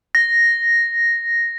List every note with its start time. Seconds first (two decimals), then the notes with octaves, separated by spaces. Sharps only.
0.15 A#6